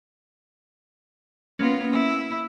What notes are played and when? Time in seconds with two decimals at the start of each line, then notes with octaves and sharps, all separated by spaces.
1.59 A#3 B3 C#4 F4
1.92 E4